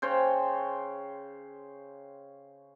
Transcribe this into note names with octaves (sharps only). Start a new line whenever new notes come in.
C#3 C5 C#5 G5